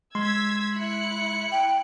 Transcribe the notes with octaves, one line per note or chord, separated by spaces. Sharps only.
G#3 C6 E6 G#6 B6
E4 F#6 C#7
G5